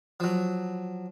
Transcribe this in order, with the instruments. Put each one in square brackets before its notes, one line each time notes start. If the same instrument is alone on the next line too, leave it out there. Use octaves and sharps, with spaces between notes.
[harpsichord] F3 F#3